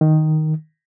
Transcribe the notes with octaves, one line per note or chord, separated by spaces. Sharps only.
D#3